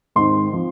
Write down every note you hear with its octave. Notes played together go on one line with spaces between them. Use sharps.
G#2 D#3 C4 C6
F3 C4